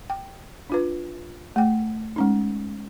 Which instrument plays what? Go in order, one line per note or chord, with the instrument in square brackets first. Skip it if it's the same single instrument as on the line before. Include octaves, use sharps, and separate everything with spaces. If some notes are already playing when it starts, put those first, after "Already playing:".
[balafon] G5
D4 F4 B4
A3 G5
G#3 C#4 D#4